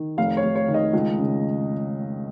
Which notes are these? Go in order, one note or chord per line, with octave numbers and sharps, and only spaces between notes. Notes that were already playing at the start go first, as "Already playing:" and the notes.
Already playing: D#3
F1 F5
C#5
F1
C#5
D#3
D#5
C#2
C#3